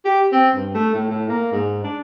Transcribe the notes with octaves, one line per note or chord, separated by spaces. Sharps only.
G4
C4
G2
A3
A2
A2
A#3
G#2
D4